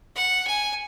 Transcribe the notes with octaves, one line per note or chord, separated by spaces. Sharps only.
F#5
G#5